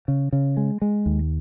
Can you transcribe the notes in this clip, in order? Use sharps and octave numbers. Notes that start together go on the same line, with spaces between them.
C#3
C#3
G#3
G#3
D#2